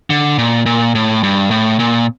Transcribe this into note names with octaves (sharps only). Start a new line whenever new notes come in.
D3
A#2
A#2
A2
G2
A2
A#2